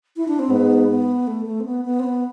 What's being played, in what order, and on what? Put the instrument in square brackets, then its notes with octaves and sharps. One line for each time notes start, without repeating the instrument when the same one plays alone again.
[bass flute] E4
D4
C4
[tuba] G#2 [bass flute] B3
[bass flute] B3
A3
A3
C4
B3
B3
C4
B3